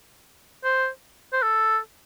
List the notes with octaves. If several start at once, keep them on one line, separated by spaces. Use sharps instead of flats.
C5
C5
A4